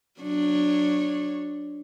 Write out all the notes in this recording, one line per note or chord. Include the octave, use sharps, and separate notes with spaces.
F#3 D4 C#5